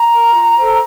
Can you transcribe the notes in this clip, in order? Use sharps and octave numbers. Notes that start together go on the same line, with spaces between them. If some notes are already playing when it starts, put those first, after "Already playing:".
Already playing: A#5
A#4
F4
A4 C5